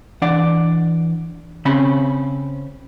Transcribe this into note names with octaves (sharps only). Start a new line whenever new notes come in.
E3 D4 D5 F#5
C#3 C4 C#4 B5